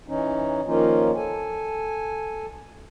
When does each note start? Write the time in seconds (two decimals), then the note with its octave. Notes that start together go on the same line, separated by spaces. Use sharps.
0.08 E3 C#4 D#4
0.67 D#3 F3 A#3 C#4 D#4 F4
1.16 A4 G#5